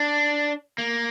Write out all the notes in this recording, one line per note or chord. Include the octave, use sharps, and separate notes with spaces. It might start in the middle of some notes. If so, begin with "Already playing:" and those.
Already playing: D4
A#3